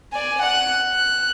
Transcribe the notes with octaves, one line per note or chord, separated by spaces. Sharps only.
D5 G#5
F#5 F#6
F#6